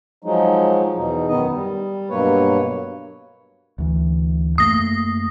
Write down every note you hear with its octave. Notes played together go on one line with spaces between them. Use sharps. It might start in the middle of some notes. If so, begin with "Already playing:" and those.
F3 F#3 G#3 D#4
E2 B2 D#4
F#2 D#3 B3 D#4 D#5
G3
G2 B2 F#3 A#3 B4 C#5
D2 E3
F#2 A3 A#3 D#6 A#6